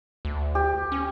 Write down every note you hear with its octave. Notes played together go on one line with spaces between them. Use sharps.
D2
G4
C#4